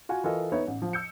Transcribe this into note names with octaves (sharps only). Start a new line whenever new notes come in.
F4 F#4 F#5 G#5
E3 F4 A4 A#4 D#5
B3 D#4 C#5 E5
A1
F3
E6 G6 C#7